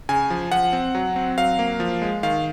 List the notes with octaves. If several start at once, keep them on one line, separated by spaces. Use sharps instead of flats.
C#3 G#5
F3
F3 F#5
C4
F#3
C4
F#3 F5
A#3
F3
G#3
D#3 F5